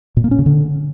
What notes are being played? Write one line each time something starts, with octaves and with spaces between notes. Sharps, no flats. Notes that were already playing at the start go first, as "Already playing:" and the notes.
A#2
A#3
C#4
C#3
D3